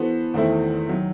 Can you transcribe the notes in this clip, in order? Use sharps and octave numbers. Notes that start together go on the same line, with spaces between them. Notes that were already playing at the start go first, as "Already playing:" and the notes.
Already playing: E3 B3 F#4 A4 C5
E2 D#3 A3 C4 E4
D#3 F#3